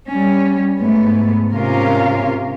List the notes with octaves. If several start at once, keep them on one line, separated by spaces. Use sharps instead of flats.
G3 C#4
G#2 A3 B3
G#2 C3 C#4 F4 A#4 F5